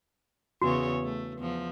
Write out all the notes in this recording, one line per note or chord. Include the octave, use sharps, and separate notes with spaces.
E2 C#3 F#4 C#5
A3
E2 F3